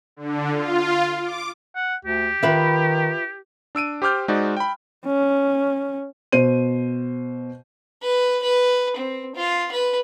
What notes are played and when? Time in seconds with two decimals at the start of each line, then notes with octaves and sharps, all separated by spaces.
0.17 D3
0.52 F4
1.22 D6
1.76 F#5
2.05 D2 G4
2.43 D#3 F4 B4 E5
3.75 D4 E6 D7 D#7
4.02 G4 C5 D6 F6 G6
4.28 G#3 D#4 F#4 C5 D5
4.57 G5 B5
5.06 C#4
6.32 B2 C5 D#7
8.02 B4
8.43 B4
8.96 C4
9.36 F4
9.72 B4